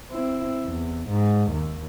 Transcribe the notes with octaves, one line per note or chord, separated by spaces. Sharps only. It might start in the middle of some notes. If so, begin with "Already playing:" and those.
C4 E4
E2
G#2
D#2